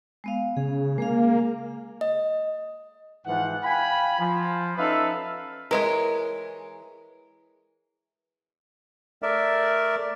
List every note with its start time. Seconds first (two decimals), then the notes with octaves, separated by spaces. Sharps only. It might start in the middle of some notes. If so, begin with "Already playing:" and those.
0.24 G#3 B3 F5
0.57 C#3 G#4
0.98 G#3 A#3 G#4 F5
2.01 D#5
3.26 G#2 E3 F3 F#5
3.63 F5 G5 G#5 B5
4.19 F3
4.78 C#4 D#4 A4 B4 E5 F5
5.71 E3 G#3 A#4 C#5
9.22 A3 A#4 D5 E5